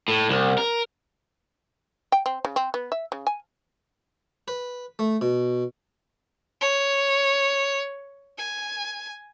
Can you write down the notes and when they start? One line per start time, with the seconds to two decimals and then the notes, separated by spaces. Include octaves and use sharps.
0.08 A2
0.29 C2
0.58 A#4
2.12 G5
2.26 C4
2.45 C#3
2.56 C4
2.74 B3
2.92 E5
3.12 C#3
3.27 G#5
4.48 B4
4.99 A3
5.21 B2
6.61 C#5
8.39 G#5